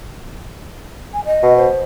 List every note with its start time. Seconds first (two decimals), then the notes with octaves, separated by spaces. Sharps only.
1.14 G#5
1.25 D#5
1.43 B2
1.57 C5